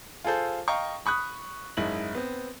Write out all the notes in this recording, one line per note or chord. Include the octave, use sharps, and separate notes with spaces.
F4 G#4 A4 C5
D#5 F5 G5 A#5 C#6
B5 C#6 D#6 F#6
F#1 G#2 D#4 E4 F#7
B3 C4